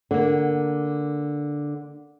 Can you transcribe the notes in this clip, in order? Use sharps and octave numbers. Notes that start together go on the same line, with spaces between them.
D3 A#3